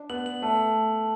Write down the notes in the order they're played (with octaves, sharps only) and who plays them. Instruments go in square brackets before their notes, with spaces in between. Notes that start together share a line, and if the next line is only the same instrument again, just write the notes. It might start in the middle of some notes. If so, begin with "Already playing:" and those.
Already playing: [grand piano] D4
[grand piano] B3 [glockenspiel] F#7
[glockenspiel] F#7
[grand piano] A3 [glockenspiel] A5